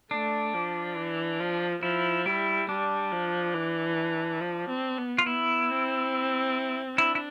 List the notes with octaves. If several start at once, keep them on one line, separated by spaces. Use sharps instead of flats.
A3 D4
F3
E3
F3
F3 E4
G3 E4
G3 D4
F3
E3
F3
C4
B3
F4
B3 E4
C4
D4 E4
E4